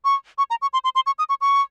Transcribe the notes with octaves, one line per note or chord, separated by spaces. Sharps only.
C#6
C#6
A#5
C#6
C6
C6
C6
C#6
D#6
C#6
C#6